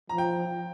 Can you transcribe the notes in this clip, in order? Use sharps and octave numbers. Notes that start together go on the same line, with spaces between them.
F3 A#5
G5